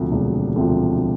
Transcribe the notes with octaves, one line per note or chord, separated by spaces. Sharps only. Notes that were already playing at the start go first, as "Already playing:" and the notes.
Already playing: E1 D2 C3 F3
E1
D2 C3 F3